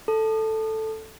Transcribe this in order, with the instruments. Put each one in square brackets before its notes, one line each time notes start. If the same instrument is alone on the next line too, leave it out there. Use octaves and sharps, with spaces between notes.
[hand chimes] A4